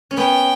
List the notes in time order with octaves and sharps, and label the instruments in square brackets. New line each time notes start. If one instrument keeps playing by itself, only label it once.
[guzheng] C#4
[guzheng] B3 [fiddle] G5